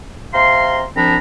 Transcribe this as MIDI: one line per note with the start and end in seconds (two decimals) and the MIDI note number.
0.34 0.83 48
0.34 0.83 77
0.34 0.83 82
0.34 0.83 84
0.96 1.16 36
0.96 1.16 53
0.96 1.16 60
0.96 1.16 62
0.96 1.16 82
0.96 1.16 83